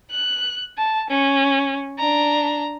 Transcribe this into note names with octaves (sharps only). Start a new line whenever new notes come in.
F#6
A5
C#4
D4 A#5